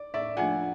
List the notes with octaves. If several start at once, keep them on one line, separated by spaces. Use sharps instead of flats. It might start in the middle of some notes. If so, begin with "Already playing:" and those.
Already playing: D5
A2 D5 E5
F3 A3 D4 F4 F#5 G#5